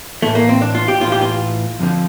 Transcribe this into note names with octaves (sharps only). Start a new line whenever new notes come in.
A2 E3 A3
A#3
C4
D4
F4
G4
A2 E3 F4
G4
F4
F2 D3 F3